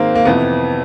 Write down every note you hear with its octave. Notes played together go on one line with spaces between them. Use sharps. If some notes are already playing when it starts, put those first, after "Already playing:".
Already playing: G#2 D#3 A#3 C4
A#3
F2 C3 E3 B3